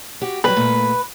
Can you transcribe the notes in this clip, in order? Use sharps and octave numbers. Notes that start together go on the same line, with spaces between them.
F#4 G4
F#3 G3 B4
A#2 A3